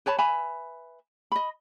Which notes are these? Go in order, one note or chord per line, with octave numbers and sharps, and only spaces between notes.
B4 C#5 A5 B5
B4 E5 G#5 B5
D#5 B5